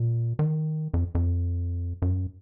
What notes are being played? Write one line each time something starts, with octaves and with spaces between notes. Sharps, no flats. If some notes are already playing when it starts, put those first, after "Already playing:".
Already playing: A#2
D#3
F2
F2
F#2